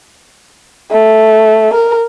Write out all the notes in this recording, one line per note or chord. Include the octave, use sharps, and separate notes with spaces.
A3
A#4